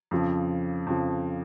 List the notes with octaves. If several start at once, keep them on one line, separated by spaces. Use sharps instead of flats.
F2 C#3 F3
F2 C#3 F3